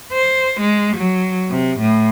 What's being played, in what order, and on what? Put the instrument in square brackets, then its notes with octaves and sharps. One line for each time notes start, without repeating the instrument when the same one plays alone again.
[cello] C5
G#3
F#3
C3
A2